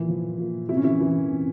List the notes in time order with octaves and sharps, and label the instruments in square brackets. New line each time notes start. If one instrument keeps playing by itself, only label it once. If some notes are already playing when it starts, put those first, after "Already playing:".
Already playing: [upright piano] A#2 E3 E4
F3
A#2
C3 E4
C#4
E3 E4
E3
C3